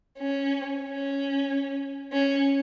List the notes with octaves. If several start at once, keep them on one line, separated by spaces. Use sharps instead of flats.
C#4
C#4
C#4